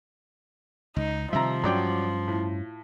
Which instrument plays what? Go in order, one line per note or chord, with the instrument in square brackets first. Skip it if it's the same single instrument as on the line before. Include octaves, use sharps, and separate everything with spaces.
[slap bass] C#2 [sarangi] D#4
[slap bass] C3 D#3 G3 [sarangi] F3 [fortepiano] E5 A#5
[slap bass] G2 C#4 [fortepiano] F#3 D5 G5
[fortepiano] A2